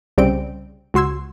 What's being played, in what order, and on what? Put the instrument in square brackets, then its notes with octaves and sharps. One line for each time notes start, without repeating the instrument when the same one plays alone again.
[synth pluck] C2 C#3 G3 C4 G5 D7
C#2 F#4 C6 E6 G#6